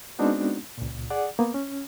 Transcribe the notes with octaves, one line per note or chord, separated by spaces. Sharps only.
G#3 B3 C4 D4 D#4 F#4
C#2 A#2
G#4 D5 F#5
A#3 B3
C#4